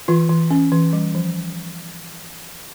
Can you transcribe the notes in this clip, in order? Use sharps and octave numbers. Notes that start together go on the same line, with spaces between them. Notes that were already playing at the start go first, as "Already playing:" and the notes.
E3 F4
E3
C#4
E3
G3
F3